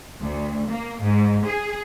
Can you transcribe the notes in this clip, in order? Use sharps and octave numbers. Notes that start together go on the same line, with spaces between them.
D2
A#3
G#2
G#4